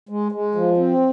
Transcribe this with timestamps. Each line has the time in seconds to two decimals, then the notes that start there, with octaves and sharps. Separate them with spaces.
0.09 G#3
0.32 G#3
0.55 F3
0.77 C4